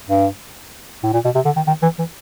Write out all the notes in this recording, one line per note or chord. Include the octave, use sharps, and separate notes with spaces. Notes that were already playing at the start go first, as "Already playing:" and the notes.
G2
A2
A#2
B2
C3
D3
D#3
D#3
E3
E3